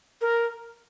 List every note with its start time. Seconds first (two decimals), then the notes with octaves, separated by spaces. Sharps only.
0.21 A#4